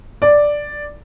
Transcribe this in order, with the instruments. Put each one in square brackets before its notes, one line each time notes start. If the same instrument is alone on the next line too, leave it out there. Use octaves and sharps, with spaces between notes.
[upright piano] D5